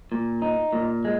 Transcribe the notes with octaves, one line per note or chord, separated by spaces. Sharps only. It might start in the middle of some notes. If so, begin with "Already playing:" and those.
A#2
D#4
A#2
G#3